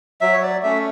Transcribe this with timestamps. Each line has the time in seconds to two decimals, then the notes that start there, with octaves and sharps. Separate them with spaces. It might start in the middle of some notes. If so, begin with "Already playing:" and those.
0.21 F#3 E5
0.33 C#5
0.43 D5
0.63 A3 C#4 E5